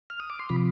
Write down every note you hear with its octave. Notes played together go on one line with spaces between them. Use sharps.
F6
D#6
D6
C6
C3 F3 B5